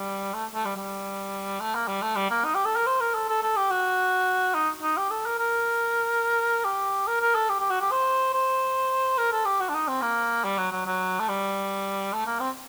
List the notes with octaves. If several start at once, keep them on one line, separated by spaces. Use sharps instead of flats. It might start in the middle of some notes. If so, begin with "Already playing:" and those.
Already playing: G3
A3
A3
G3
G3
A3
A#3
G3
A3
G3
A#3
D#4
G4
A4
A#4
C5
A#4
A4
A4
A4
G4
F#4
D#4
D#4
G4
A4
A#4
A#4
G4
A#4
A#4
A4
G4
G4
F#4
G4
C5
C5
A#4
A4
G4
F#4
D4
D#4
C4
A#3
G3
F#3
F#3
F#3
A3
G3
A3
A#3
C4